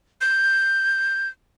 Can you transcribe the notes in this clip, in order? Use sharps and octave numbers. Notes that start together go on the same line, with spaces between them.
G6